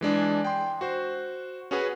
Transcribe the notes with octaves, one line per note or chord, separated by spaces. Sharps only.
E3 G#3 D4 G#4
G5 C6
F#4 C5
C#4 F#4 G#4 B4 G#5